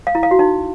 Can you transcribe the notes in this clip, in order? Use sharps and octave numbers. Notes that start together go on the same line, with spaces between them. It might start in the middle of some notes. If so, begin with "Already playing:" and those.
F5
E4
F5
F#4
D#4